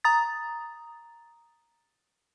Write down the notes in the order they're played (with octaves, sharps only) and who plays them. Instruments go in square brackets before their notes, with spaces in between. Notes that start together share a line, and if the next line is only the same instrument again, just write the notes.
[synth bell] A#5 D#6 A6